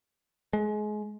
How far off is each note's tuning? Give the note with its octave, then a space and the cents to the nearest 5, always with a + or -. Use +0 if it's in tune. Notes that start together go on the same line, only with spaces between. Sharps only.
G#3 +25